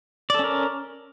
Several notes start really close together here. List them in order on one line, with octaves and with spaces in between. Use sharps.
D5 A4 C#4 A#4